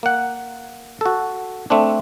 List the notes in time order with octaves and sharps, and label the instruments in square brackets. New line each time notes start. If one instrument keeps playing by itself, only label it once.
[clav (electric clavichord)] A#3 F#5
F#4 A4
A3 C4 D4